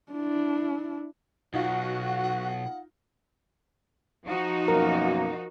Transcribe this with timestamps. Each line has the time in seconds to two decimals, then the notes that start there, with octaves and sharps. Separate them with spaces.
0.12 D4 E4
1.54 B1 D#4 F4 F#4 F#5
4.26 F3 D#4 F#4
4.68 F#2 B2 A#3 A#4